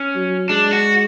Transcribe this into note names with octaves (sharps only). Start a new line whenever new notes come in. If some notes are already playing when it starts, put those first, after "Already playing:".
Already playing: C#4
F#3
G#3 D4
F#4